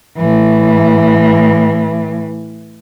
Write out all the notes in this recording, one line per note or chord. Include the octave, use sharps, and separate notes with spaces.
A2 E3